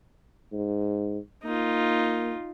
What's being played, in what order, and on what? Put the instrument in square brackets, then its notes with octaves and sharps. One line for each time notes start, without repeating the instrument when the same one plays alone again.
[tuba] G#2
[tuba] A#3 [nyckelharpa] D#4 F4